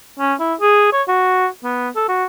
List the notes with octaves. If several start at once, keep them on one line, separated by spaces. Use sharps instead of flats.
C#4
E4
G#4
C#5
F#4
B3
A4
F#4